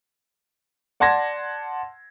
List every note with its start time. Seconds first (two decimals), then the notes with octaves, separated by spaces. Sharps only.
1.00 D5 F#5 A5 C6 G#6 A#6